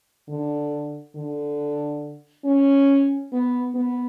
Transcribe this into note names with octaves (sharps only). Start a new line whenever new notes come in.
D3
D3
C#4
B3
B3